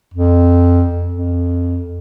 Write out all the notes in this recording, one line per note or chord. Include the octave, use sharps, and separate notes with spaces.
F2
F2